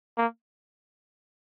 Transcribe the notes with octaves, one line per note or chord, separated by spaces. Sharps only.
A#3